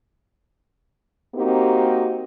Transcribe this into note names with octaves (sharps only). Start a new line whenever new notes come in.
A#3 C4 D#4 F#4 G4